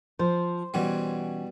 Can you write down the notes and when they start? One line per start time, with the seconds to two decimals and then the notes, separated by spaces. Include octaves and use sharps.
0.19 F3 C5
0.74 B2 E3 G3 C#4 F#5